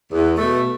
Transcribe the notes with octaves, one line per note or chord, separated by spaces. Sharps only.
E2
B2 A3